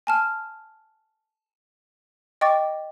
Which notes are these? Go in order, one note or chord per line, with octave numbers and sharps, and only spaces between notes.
G#5 A5 F6
D#5 G5 C#6 D6 A6